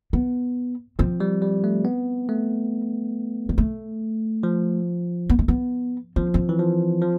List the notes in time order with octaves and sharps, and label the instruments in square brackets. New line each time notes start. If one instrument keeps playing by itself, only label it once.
[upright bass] B3
[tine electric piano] F3 [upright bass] C4
[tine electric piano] G3
G3
A3
B3
A3
[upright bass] B3
A3
[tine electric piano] F3
[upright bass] B3
A3
B3
[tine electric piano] F3 [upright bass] C4
[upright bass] C4
[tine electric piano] E3
F3
F3